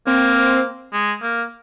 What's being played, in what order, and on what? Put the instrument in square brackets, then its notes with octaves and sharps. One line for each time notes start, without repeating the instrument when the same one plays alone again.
[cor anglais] A#3 [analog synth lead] C4
[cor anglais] G#3
A#3